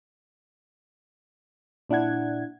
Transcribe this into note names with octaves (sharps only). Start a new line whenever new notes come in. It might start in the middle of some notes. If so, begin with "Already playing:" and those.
A#2 D4 E4 F#5 G#6